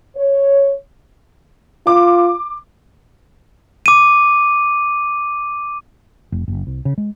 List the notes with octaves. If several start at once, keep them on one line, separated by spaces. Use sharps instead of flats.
C#5
F4 D6
D6 D#7
F1
F#1
C2
C#3
G#3